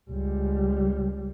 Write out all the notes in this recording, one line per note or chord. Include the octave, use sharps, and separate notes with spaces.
C#2 G3